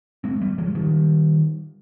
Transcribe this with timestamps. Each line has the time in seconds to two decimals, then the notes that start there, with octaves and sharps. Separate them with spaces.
0.24 G#3 C4
0.42 G3 B3
0.58 F3 G#3
0.75 D#3 G3